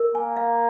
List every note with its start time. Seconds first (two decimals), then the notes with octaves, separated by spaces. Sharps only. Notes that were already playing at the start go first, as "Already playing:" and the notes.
Already playing: A#4
0.15 A#3 G#5
0.37 F5